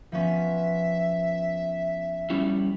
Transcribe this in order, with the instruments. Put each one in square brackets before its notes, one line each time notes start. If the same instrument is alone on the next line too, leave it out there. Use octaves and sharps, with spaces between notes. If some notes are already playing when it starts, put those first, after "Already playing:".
[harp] F3 B3 C#4 [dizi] E5
[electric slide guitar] G3 C#4 E4